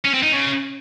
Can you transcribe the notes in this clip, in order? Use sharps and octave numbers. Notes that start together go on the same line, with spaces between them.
C#4
C4
D#4
C#3